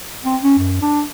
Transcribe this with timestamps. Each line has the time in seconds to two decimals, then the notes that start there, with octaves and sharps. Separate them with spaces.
0.25 C4
0.43 C#4
0.58 F#2
0.82 D4